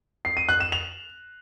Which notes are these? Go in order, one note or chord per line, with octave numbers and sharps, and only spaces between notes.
C7
D#7
F#6
E7
F7